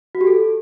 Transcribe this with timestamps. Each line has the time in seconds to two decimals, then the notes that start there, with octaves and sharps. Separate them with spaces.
0.15 F#4
0.21 G4
0.27 A4